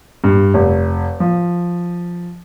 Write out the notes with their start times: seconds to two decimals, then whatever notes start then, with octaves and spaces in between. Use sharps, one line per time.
0.24 G2
0.54 F1
1.20 F3